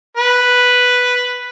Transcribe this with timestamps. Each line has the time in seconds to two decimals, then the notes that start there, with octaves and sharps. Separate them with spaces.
0.17 B4